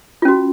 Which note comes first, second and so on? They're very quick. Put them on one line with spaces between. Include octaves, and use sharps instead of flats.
F4 C#4 F#4